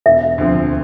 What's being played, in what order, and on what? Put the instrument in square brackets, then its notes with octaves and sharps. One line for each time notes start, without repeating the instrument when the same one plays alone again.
[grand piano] E1 [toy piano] E5
[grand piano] D2 D3 F3 C4